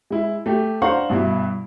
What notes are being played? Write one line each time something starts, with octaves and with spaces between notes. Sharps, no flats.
G#3 E4
A3 G4
D4 C5 F5 F#5 A#5 C#6
G2 B2 E4